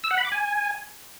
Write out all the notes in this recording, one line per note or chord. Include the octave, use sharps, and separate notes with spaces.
E6
F#5
B5
D6
G#5